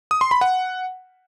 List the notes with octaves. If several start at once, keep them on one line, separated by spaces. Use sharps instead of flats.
D#6
C6
B5
F#5